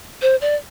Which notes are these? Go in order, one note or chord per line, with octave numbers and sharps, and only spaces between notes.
C5
D5